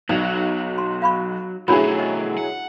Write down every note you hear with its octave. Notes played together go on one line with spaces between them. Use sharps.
B1 F#3 D5 D#5
C6
F5 B5 C#6
B2 F#3 A3 C#4 D4 E4 G#4 B5
D#5
F#5